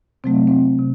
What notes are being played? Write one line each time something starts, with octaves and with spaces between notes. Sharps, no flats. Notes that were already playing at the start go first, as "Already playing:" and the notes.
C3 F#3 A3 C4
C4
C3